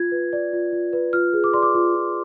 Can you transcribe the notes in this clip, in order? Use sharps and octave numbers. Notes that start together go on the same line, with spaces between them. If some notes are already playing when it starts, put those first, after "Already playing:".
Already playing: F4 G#6
B4
D5
F4
F4
B4
F4 F6
G#4
D6
D5 C6
D6
F4
F4